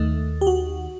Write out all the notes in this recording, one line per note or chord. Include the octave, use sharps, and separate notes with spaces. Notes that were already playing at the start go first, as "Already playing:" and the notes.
Already playing: D#2 D#3 A3
G4
F#4